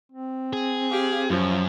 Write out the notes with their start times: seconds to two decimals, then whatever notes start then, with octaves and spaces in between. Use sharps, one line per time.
0.12 C4
0.53 G#4
0.90 G4 F5
1.30 F#2 F3 C#4